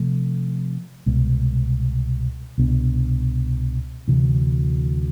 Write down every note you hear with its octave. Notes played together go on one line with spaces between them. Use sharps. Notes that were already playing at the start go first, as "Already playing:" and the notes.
Already playing: C3 F3 A3
C2 B2 G#3 B3
C2 B2 B3 D4
D2 C3 E3